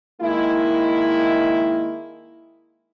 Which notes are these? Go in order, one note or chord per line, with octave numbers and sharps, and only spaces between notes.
D#3 G#3 A#3 E4